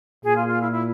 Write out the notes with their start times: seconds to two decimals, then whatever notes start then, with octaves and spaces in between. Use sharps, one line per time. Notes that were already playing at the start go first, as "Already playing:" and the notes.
0.24 A#2 G#4
0.36 F4
0.48 F4
0.60 E4
0.71 E4